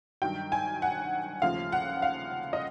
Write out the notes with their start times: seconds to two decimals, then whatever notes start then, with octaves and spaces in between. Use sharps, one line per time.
0.22 G2 D#3 F#3 G5
0.52 G#5
0.82 F#5
1.42 D#2 C#3 F3 A3 F5
1.72 F#5
2.02 F5
2.53 D#5